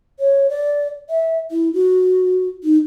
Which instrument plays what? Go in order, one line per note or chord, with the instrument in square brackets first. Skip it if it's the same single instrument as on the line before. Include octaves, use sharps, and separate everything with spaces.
[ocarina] C#5
D5
E5
E4
F#4
D#4